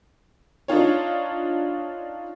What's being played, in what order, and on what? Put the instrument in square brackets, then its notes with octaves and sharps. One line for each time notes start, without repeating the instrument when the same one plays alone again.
[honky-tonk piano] D4 D#4 F4 C#5